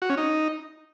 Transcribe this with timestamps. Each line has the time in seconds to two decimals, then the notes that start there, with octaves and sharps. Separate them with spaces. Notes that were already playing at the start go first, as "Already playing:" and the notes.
0.02 F#4
0.10 C#4
0.17 D#4